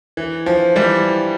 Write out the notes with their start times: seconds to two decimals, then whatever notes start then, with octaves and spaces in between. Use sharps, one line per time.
0.17 E3
0.46 F3
0.76 E3 G3